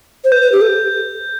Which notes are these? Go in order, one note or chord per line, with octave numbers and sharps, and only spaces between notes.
C5
B4 G6
B4
G4
A4